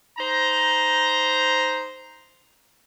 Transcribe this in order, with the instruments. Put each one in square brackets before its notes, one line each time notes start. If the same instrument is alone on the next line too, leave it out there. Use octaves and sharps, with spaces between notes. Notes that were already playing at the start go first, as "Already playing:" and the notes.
[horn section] D#4 C5 A#5